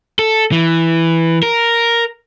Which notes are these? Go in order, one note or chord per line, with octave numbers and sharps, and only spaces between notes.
A4
E3
A#4